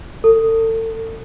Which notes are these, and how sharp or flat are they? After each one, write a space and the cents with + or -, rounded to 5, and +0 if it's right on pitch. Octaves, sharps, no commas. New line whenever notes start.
A4 +35